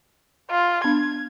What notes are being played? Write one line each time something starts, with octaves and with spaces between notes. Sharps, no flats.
F4
B3 D4 G#6